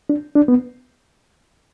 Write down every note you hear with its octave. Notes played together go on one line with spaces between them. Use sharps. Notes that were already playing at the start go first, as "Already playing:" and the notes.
D4
D4
B3